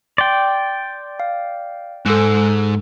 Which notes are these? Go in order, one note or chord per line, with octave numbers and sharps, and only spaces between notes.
D5 G5 C6
F5
G#2 A4 E6 F#6